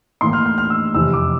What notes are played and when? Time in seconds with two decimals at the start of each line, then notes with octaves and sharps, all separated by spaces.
0.21 A2 E3 A#3 C6
0.33 F6
0.46 F6
0.58 F6
0.70 E6
0.94 F2 C3 E3 E6
1.13 D6